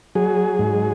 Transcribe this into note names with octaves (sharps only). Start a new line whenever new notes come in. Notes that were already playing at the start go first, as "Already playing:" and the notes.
F#3 G#4
G#2